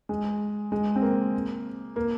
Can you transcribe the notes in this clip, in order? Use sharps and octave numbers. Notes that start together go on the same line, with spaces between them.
G#3
G#3
C4
A#3
A#3